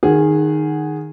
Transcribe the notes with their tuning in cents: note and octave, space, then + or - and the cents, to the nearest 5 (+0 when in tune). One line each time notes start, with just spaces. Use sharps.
D#3 -15 G#4 -5 F#5 +0